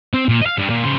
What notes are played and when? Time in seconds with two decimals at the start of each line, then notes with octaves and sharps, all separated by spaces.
0.14 C4
0.29 A#2
0.42 D#5 F5
0.58 G2
0.70 A#2
0.84 C#3 C5